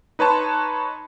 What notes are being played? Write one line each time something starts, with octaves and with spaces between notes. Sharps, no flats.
D#4 B4 C#5 A5 C6